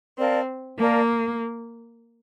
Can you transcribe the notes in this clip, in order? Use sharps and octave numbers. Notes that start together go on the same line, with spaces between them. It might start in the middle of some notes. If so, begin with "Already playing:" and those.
C4 A#4 D5 F5 A5
A#3 A#4 D5 F5 A5